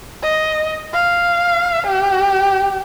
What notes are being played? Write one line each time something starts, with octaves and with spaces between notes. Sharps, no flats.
D#5
F5
G4